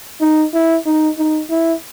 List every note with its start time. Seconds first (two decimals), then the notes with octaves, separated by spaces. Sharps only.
0.21 D#4
0.54 E4
0.86 D#4
1.18 D#4
1.50 E4